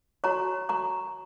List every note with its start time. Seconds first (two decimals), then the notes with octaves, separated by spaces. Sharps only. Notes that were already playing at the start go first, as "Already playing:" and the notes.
0.24 F#4 C#5 A#5 C#6
0.69 A#5 C#6